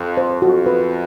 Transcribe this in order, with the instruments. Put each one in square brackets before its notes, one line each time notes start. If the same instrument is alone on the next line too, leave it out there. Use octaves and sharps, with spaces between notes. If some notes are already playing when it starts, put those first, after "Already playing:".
Already playing: [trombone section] F2
[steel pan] C5
[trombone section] F2 [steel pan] F#4
[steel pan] B4